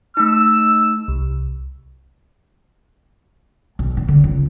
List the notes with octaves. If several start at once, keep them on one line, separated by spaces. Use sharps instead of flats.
A3 D#4 E6
C2
B1
A#2
D3
C#2